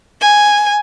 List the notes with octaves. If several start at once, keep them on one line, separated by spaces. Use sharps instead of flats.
G#5